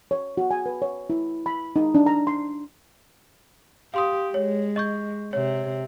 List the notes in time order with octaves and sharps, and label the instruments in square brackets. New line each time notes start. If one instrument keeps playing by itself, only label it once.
[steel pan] C#5
F#4
G#5
B4
C#5
E4
B5
D#4
D4
A#5
C6
[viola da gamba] G4 [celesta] F5 C6 D#6
[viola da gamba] G#3 [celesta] C#5
[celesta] D#5 C#6 G6
[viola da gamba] C3 [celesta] C#5